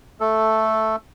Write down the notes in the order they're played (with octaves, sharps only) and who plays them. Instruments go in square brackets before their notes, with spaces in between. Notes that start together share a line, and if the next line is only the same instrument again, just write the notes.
[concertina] A3 A4